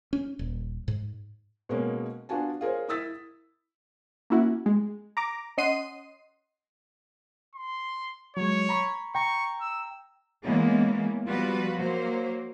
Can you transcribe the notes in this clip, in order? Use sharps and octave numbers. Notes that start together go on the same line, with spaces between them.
C#4
D#1
G#2
B2 G#3 A#3 C#4
B3 D4 F4 F#4 G#5 A5
F4 G#4 A#4 C5 C#5
E4 D#6 E6 A6 B6
A#3 C#4 E4 F#4
G#3
A#5 D6
C#4 D#5 F#5 C6 C7 D#7
C6
F#3 G#3 C#5
A#5 B5 C#6
G5 A#5 C#6
E6
E3 G#3 A#3 B3 C#4
F3 G3 B3 F4 F#4 B4
F#3 A#3 C5